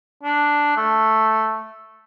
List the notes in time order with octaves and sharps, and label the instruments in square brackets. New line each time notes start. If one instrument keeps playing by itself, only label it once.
[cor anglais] D4
A3